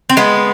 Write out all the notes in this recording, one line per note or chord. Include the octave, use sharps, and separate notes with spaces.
C4
G#3 B3